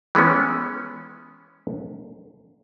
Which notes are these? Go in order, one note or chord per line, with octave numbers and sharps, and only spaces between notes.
E3 G#3 B3 C#4